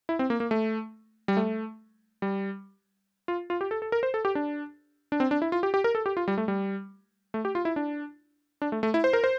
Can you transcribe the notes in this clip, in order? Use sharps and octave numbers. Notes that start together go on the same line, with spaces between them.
E4
C4
A#3
A#3
A3
G3
A3
G3
F4
F4
G4
A4
A4
A#4
C5
A4
G4
D4
D4
C4
D4
E4
F4
G4
G4
A#4
A4
G4
F4
G3
A3
G3
A3
G4
F4
E4
D4
D4
A3
A3
E4
C5
A#4
C5